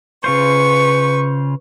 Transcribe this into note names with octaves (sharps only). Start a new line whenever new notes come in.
C#3 F4 B4 C5 C#6